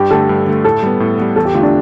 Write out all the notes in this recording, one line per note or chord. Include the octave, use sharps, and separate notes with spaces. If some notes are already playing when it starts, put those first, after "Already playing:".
Already playing: G2 G4
D3 A3 A4
G2
D3 A3
A2 A4
G3 B3
A2
G3 B3
E2 A4
G4
D3 A3 F4
D4